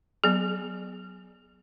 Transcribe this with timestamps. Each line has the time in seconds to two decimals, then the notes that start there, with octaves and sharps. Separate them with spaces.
0.24 F#3 B3 G#4